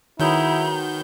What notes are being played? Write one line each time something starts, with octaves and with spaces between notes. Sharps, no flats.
D#3 F#3 G#3 B3 E4 A#5 G6